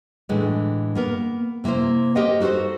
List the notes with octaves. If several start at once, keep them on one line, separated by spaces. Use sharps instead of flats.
A2 D3 E3 G#3
A#3 B3 A#4
C3 A#3 E4 A#4 C5
G4 A#4 C5 D#5 F5 F#5
D#4 F#4 A4 A#4 C5